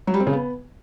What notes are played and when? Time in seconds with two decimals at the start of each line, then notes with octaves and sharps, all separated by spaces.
0.07 F#3
0.14 G3
0.20 C4
0.27 C#3
0.33 B3